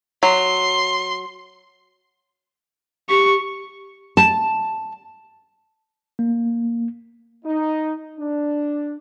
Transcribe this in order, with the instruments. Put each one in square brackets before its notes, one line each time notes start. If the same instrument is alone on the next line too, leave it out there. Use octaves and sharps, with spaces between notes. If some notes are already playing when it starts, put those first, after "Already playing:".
[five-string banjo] F#3 [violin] C6
[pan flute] G4 [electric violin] C#6
[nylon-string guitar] A5
[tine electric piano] A#3
[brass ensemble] D#4
D4